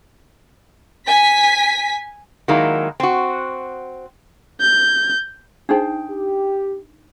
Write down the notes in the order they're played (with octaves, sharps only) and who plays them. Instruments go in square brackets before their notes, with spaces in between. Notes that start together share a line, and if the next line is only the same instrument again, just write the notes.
[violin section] G#5 B6
[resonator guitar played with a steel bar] D#3 F#3 G#3 A#3 E4
C4 F#4
[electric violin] G6
[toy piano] D4 D#4 [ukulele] G#4 C5 G5
[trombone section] G4